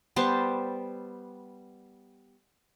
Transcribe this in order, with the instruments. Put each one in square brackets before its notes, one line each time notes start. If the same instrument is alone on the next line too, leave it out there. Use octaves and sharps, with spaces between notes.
[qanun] G3 B3 C5 A5